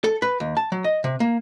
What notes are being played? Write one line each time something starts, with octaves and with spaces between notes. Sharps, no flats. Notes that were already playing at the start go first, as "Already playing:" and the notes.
A4
B4
D#2
A5
F#3
D#5
C3
A#3